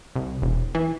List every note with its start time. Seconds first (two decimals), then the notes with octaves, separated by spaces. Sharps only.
0.16 C2
0.42 E1
0.75 E3